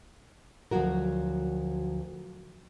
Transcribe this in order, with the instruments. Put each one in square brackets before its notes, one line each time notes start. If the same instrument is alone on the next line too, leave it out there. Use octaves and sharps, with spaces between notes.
[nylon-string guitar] D2 F3 F#3 F#4 A#4